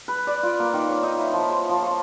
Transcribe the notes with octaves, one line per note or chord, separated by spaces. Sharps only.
B4
D5
F4
A#3
D#3
C#5
D#4
E4
F3
C5
F3
C#6